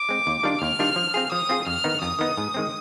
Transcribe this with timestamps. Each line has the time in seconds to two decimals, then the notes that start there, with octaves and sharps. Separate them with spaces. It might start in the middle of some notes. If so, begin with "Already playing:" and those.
Already playing: D6
0.09 G#3 C4
0.27 D#2
0.43 D#3 G3 D4 F4
0.61 D#2 F6
0.79 D#3 G3 D4 F4
0.96 F3
1.14 C4 F4 G#4
1.32 F3 D#6
1.49 C4 F4 G#4
1.67 F2 F6
1.84 D#3 B3 D#4
2.02 F2 D#6
2.19 D#3 B3 D#4
2.37 G#2
2.54 D#3 G#3 C4